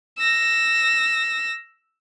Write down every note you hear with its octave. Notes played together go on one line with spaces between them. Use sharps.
E6 A#6